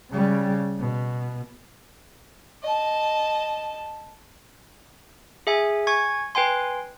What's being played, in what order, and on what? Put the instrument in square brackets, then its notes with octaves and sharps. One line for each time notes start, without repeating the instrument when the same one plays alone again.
[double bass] C#3 G3
B2
[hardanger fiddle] D#5 A5
[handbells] G#4 E5 G#5
G#5 C#6 G#6
B4 G5 G#5 C6